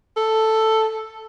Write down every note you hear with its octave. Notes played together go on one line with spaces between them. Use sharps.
A4